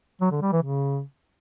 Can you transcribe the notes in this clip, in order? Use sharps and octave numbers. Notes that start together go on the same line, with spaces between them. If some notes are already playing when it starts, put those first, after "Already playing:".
F#3
D3
G3
E3
C#3